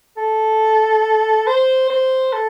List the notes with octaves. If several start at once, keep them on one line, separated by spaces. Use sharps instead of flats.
A4
C5
C5
A4